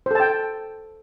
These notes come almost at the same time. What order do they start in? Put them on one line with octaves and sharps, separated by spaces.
C5 A4 A5 G5